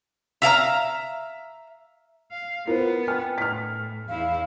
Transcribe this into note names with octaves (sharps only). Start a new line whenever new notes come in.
E5 F5 G5 A#5
F5
B3 E4 F4 A#4 C5
G5 G#5 F6
A2 F6 B6
E2 E4 F5